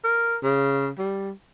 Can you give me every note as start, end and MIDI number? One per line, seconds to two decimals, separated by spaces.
0.04 0.36 70
0.43 0.89 49
0.98 1.31 55